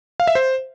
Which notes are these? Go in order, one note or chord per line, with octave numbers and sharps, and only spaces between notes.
F5
E5
C5